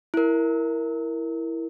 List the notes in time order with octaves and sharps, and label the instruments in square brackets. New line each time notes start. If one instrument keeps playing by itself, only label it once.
[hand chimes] E4 A#4